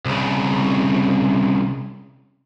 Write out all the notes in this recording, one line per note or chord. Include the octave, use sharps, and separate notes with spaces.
C2 C#3